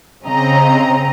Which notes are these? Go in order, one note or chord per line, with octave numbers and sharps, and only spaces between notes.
C#3 C4 D#5 A#5